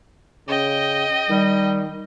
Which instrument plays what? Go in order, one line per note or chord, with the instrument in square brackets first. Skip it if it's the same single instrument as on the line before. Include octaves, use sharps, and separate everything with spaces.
[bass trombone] C#3 [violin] D#5 G5
[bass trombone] D#3 [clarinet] G3